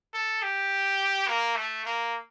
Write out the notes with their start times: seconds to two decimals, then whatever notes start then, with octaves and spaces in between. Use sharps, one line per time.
0.14 A4
0.42 G4
1.28 A#3
1.56 A3
1.85 A#3